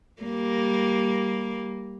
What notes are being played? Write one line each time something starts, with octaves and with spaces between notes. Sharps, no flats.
G3 A#3